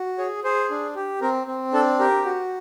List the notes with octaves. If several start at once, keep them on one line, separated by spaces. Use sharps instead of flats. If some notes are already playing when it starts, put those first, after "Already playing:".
Already playing: F#4
G#4 C#5
G#4 C5
D4
G4
C4 A#4
C4
D4 A4
G4 A#4
F#4